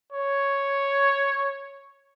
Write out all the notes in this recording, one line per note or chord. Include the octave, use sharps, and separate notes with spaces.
C#5